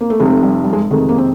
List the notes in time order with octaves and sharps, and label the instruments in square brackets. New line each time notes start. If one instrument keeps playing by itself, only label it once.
[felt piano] A#3
A3
[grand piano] F1 F2 C3 [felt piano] G#3
[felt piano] A3
G3
G3
G#3
[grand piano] F2 C3 D#3 G#3 [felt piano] A3
[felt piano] A#3
C4